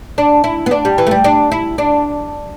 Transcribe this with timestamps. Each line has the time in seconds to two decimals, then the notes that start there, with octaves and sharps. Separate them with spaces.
0.18 D4
0.44 E4
0.66 B3
0.71 D4
0.85 G3
0.98 E3
1.07 A3
1.11 G3
1.24 D4
1.52 E4
1.78 D4